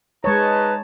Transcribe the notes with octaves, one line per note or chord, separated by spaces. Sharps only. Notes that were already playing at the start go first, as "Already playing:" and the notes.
G#3 D#4 B4 C#5 A5